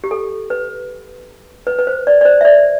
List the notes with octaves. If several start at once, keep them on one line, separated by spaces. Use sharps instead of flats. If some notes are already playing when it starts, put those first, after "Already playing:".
G4
A4
B4
B4
B4
C5
D5
D5
C5
E5
D5